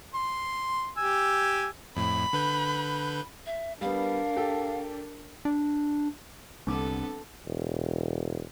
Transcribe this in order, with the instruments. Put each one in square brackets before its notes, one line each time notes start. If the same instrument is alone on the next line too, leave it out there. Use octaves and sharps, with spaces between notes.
[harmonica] C6
G4 G#5 E6
[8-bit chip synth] F2 A2 [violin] B5
[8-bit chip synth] D3 B4 G6
[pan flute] E5
[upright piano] G3 B3 [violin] D4 A#4 [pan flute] F5
[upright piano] G4 A4
[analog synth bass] D4
[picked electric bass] C2 [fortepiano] G2 D3 D6 [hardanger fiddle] B3 A4 [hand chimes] C4 D4
[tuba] E1